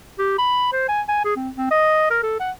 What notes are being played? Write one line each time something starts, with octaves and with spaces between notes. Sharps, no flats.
G4
B5
C5
G#5
G#5
G#4
C4
C4
D#5
A#4
A4
F#5